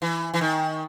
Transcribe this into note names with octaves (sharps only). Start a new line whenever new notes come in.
E3
E3
D#3